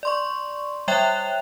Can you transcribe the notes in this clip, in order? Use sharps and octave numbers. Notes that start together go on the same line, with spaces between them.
D5 C6 C#6
G3 C#5 E5 G5 F#6 F7